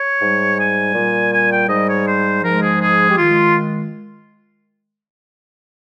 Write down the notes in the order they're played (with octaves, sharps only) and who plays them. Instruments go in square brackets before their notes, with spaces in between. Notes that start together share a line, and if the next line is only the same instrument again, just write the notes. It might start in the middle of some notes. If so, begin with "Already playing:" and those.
Already playing: [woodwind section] C#5
G#2 G3
G#5
A#2 G3
G#5
G5
G#2 G3 D#5
C#5
C5
G#2 F3 G#3 A#4
G#4
G#4
G4
D#3 G#3 F4